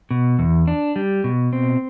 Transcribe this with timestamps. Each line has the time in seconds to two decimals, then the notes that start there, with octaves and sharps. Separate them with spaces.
0.11 B2
0.39 E2
0.68 D4
0.96 G3
1.24 B2
1.53 C4